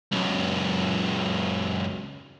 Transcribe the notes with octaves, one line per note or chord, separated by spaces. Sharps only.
C#2 F#2